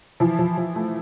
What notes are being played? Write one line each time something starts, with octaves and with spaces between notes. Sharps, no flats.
E3 F3 E4
F3
F3
A3